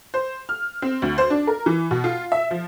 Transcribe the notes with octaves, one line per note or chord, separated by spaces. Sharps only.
C5
F6
C4
D2
C5
D4
A#4
E3
B2
F4
E5
F3